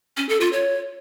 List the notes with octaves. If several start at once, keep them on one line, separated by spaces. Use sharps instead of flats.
C#4
A4
F4
C#5